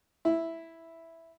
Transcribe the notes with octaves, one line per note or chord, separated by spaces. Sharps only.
E4